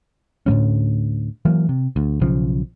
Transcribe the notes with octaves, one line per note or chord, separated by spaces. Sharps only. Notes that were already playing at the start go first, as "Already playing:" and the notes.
D2 A2 G3 C#4
E3 F#3 A#3
C3
D2
B1 C#3 F3